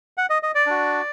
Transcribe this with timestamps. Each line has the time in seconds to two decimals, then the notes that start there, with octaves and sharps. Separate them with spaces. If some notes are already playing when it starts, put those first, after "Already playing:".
0.18 F#5
0.30 D#5
0.43 D#5
0.55 D5
0.67 D4 F#4